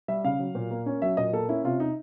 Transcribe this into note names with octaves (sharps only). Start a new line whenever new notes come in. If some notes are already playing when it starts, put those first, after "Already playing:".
G3 E5
C#3 F5
F#3
A#2
A#3
C#4
F#3 E5
A#2 D#5
A#3 A4
C#4 E4
C3 F4
D#4